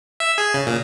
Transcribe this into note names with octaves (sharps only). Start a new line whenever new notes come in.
E5
G#4
C#3
A#2